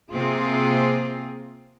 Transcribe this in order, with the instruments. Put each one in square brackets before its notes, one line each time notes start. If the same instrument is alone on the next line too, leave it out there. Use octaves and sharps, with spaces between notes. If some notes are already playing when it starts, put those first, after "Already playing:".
[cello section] C3 A#3 C4 F4 G#4